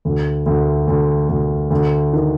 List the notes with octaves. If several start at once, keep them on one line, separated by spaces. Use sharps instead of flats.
D2
D2
D2
D2
D2
D#3